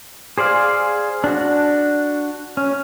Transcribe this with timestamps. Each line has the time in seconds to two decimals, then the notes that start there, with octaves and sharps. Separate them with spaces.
0.38 G#4 C5 D5 F5
1.24 D4 F#4
2.57 C#4